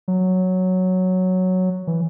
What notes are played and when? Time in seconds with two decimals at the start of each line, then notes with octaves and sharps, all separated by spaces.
0.08 F#3
1.87 E3